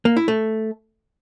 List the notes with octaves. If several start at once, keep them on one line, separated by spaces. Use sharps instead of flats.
A#3
E4
A3